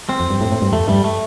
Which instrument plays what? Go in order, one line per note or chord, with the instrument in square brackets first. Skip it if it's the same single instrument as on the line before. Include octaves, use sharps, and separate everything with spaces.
[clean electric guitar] C4
[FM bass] F2
G2
A2
A2
G2
[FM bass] F2 [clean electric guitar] A3
[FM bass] G2 [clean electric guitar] G3
[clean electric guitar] A3